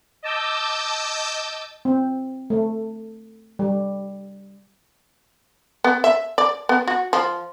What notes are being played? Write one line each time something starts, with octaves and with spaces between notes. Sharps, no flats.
D#5 A5 D6 E6 G6
C4
A3
G3
B3
E5
D5
B3
F#4
F3